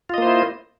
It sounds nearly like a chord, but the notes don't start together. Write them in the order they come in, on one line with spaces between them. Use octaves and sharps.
F4 D#5 A#3 C5 E4